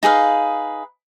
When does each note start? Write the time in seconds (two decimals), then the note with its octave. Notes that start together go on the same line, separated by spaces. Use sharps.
0.03 D#4 G#4 B4 F5